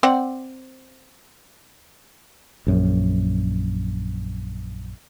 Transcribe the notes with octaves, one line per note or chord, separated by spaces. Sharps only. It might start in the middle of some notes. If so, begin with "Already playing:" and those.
C4 D5 F#5
A#1 F#2